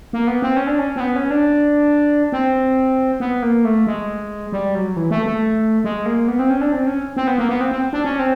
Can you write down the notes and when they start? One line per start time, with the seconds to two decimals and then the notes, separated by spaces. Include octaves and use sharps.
0.13 A#3
0.27 B3
0.42 C4
0.56 C#4
0.67 D4
0.79 C#4
0.96 C4
1.00 B3
1.16 C#4
1.30 D4
2.32 C4
3.20 B3
3.42 A#3
3.65 A3
3.87 G#3
4.52 G3
4.75 F#3
4.96 E3
5.11 A3
5.26 A3
5.84 G#3
6.06 A#3
6.28 B3
6.39 C4
6.50 C#4
6.61 D4
6.72 C4
6.87 C#4
7.17 C4
7.27 B3
7.38 A#3
7.49 B3
7.61 C4
7.71 C4
7.93 D4
8.05 C#4
8.19 C4